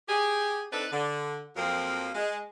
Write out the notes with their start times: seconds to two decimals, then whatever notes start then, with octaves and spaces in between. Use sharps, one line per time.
0.09 G4 G#4
0.72 C4 D4 D#4 A4 B4
0.92 D3
1.56 F2 F3 F#3 A#3 C4 A#4
2.15 G#3